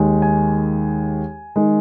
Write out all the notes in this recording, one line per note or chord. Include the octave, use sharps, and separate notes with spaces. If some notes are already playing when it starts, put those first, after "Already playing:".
Already playing: D#2 D#3 G#3
G#5
D#3 G#3